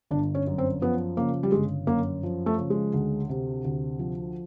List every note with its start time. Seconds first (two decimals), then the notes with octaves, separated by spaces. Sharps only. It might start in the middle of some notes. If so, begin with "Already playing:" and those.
0.11 G1 D4
0.35 C#4
0.47 F#2
0.58 C4
0.82 F3 B3
1.17 C#3 A#3
1.43 G3
1.52 G1 G#3
1.87 F#2 A#3
2.23 F3
2.46 A3
2.58 C#3
2.70 G#3
2.94 D2
3.29 C3
3.65 D2
3.99 F3